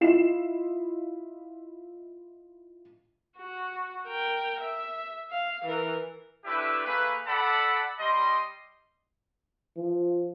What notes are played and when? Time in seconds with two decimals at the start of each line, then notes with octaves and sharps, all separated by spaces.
0.01 E4 F4 D#5 C7 E7
3.38 F#4
4.07 A#4 G5
4.61 E5
5.32 F5
5.65 E3 A#4
6.44 A3 D4 E4 G4 B4 E5
6.85 A3 A#3 G#4 B4
7.27 A4 D5 F#5 A5 B5
7.99 G3 D#5 C6
9.77 F3